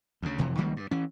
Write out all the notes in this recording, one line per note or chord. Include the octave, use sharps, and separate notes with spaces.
D2 C#3
F1 F2 C3 E3
C#2 D#3 G3 A#3
G2
E3 C#4